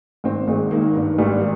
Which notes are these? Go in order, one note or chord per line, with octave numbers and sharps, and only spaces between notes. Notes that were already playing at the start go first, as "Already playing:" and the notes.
G#1 C4
G#1 G#3
D#3 A#3
G2
G#1 G3